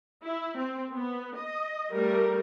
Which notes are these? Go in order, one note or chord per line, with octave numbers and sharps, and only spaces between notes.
E4
C4
B3
D#5
G3 A3 A#4